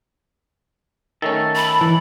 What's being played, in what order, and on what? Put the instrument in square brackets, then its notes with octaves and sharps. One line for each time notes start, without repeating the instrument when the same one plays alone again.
[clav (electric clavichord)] D#3 A3 C#4 [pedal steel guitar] A4
[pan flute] B5
[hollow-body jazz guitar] E3